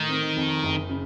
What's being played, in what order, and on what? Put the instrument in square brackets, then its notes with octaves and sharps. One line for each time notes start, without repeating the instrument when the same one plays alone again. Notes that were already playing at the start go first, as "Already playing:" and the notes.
Already playing: [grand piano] A2 [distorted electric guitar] D#3
[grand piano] C4
F2
F#1
C#3